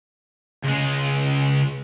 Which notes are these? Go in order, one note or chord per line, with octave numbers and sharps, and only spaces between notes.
C#2 G#3